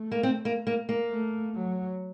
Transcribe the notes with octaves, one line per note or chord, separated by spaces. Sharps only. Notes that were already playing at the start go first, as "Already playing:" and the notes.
Already playing: A3
A#3
C4
A#3
A#3
A#3
A3
F#3